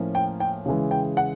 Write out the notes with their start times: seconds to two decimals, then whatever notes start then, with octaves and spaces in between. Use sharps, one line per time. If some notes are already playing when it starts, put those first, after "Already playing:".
Already playing: A2 F3 A#3 C#4
0.15 G5
0.40 G5
0.66 C#3 E3 G#3
0.91 G5
1.17 F#5